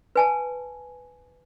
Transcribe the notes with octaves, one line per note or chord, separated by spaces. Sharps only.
B4 G#5 A5